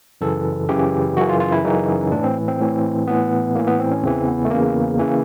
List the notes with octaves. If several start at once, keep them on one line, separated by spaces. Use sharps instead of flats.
F#2 C#3 E3 A4
F#2 C#3 E3 G4
F#2 C#3 E3 F#4
F4
F4
E4
F#2 C#3 E3 D#4
A2 E3 D4
C4
C4
A2 E3
A2 E3 B3
A2 E3 A#3
B3
C4
C#4
E2 C#3 E3 C4
B3
A3
E2 C#3 E3 A#3
C#3 E3